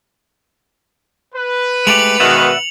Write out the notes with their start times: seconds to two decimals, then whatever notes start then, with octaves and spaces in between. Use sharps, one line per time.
1.34 B4
1.87 G#3 A3 G4 C#7 F7 F#7
2.20 B2 D#3 G#3 D5 E5 F#5